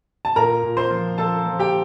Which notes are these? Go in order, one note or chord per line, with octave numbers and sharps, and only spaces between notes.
A5
A#2 A#4 A#5
A#2
C5 C6
F3
F3 A4 A5
F3
G4 G5